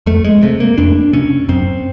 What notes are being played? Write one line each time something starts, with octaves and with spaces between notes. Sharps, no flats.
F2 A3
G#3
C3 A3
A#3
F2 D4
C3 C#4
F#2 C4